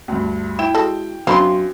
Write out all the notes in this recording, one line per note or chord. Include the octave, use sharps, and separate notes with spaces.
D2 G2
E4 G5
G#3 F#4 A4
F#2 C4 D4 F5 B5 C6